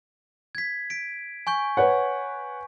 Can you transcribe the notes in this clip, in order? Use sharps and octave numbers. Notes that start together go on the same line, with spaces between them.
G#6 B6
B6 D7
G#5 C#6 G6
B4 C#5 F#5